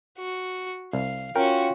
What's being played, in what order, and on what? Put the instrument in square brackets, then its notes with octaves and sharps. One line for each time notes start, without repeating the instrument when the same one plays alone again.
[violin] F#4
[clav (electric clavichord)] C2 [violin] F5
[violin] C#4 F#4 [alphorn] F4 [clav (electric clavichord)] A#4 [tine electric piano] G5